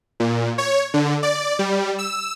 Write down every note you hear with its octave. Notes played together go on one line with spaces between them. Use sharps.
A#2
C#5
D3
D5
G3
E6